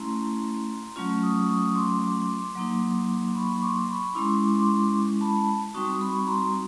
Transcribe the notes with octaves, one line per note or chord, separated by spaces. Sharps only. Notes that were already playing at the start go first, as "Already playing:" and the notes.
Already playing: A3 C#4 E4 A#5 C6
F#3 A3 C#4 F4
C#6 D#6
C#6 D#6
C6 D6
F#3 A#3 D#4
B5 C#6
C#6
C6 D6
B5 C#6
G#3 C#4 E4 C6 D6
C6 D6
A5 B5
G3 C4 D#4 F#4 C#6 D#6
B5 C#6
A#5 C6